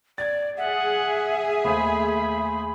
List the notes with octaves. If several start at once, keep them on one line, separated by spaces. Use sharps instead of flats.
D5 G#6 A6
G#4 E5 F#5
D#2 A3 C5 B5